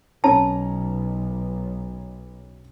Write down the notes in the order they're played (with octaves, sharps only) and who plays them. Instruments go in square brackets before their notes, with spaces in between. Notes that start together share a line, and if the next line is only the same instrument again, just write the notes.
[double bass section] B1 [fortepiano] C#4 A#5 [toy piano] A5